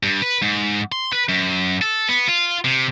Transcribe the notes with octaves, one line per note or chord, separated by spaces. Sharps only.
G2
B4
G#2
C6
B4
F#2
A4
B3
F4
C3